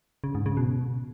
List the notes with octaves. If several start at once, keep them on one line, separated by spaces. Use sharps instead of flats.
C#3
G#2
C#3
B2